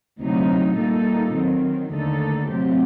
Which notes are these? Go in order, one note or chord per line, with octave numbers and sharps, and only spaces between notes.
D2 C3 F#3 A3 D#4
A#2 G3 A#3 D#4 A4
D#3 F#3 C4
D#2 D3 A3 D#4 A4
C3 F#3 A3 C4 G4